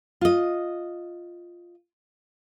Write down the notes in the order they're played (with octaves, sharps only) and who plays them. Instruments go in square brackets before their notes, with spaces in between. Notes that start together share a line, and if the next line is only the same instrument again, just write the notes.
[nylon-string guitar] F4 D#5